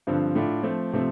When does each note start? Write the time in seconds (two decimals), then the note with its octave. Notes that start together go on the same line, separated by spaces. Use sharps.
0.07 G2 D3 F3 C4
0.35 A2 A3 D4 F4
0.63 F3 A3 C4
0.93 C3 F3 A3 C4